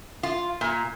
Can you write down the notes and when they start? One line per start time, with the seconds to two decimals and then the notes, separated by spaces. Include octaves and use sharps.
0.23 F4
0.61 A#2